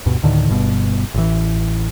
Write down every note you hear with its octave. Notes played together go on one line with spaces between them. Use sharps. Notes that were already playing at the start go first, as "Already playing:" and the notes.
D2 G2 B2
D2 A2 D3 D#3
G1 G2 B2
A1 E3